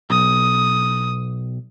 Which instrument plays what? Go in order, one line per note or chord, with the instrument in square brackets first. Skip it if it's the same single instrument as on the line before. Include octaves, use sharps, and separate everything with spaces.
[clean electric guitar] B1 [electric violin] D#6